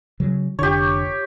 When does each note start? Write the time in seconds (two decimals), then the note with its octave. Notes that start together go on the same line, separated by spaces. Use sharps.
0.20 C#3 F#3
0.59 F1 D3 G4 C#5